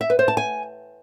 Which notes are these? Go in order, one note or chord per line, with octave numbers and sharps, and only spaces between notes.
E5
B4
C5
A5
G#5